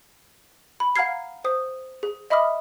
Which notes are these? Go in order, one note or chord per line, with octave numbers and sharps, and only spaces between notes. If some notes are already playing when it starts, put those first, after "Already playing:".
B5
F5 F#5 A#5 F6 G#6 C7
C5 D#6
G#4
D#5 E5 B5 D6 D#6 F6